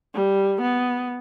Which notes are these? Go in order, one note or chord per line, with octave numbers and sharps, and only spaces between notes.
G3
B3